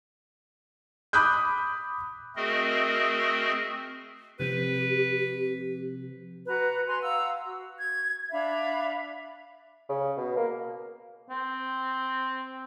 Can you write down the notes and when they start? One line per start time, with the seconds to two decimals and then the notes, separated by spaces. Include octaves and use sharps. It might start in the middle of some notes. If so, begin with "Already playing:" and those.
1.13 B5 D6 D#6 F#6 G6
2.36 A3 C4 F#4 G#4 A#4 D#5
4.40 C3 F3 C4 G4 B4
6.47 F#4 B4 A#5
6.87 B4 G#5 A#5 C6
7.01 F5 F#5 A#5 E6
7.46 F#4
7.79 G#6
8.32 D4 E5 F5 B5
9.89 C#3
10.17 B2
10.37 A#3
11.30 C4